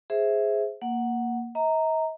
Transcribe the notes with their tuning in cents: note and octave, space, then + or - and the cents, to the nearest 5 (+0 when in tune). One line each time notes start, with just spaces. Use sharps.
G#4 +0 C5 +0 E5 +0
A#3 +0 F#5 +0
D#5 +45 A#5 -10